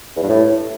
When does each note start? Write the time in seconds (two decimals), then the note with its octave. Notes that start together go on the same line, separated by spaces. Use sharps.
0.17 E2
0.23 G2
0.29 A2